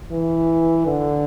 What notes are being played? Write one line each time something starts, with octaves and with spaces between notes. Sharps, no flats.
E3
D3